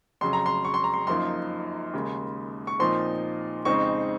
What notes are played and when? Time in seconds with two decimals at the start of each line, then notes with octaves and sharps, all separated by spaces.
0.21 F2 C#3 F#3 C6
0.33 A#5
0.46 C6
0.65 C#6
0.74 C6
0.84 A#5
0.94 C6
1.07 F#2 F3 A#3 D#4 C6
1.93 D#2 C#3 G#3
2.67 C#6
2.80 A#2 F3 C4 D#4 C6
3.65 F2 C#3 G#3 C4 D#4 C#6